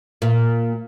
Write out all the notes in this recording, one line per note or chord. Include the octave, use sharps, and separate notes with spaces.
A#2